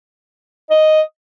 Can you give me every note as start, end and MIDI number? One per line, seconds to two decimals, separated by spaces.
0.70 1.02 75